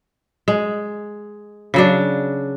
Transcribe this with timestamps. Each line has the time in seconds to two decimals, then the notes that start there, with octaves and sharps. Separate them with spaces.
0.48 G#3
1.74 C#3 F#3 D4